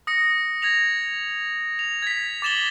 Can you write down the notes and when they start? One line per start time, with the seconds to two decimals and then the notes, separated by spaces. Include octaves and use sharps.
0.07 D#6 A#6 C#7
0.62 G#6 A#6 F7
1.79 F7
2.02 G#6 B6
2.42 D6 A6 E7 F#7 G7